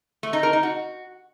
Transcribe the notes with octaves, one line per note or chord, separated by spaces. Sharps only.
A3
D#4
A#4
D#4
F#4